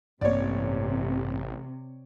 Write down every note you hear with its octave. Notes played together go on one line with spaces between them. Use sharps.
A1 G2 C3 A#3 C#5 D5